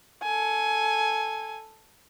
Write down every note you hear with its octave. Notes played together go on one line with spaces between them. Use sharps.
A4 G#5